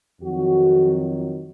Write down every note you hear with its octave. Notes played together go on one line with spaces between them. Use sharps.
F2 D#3 F#3 F#4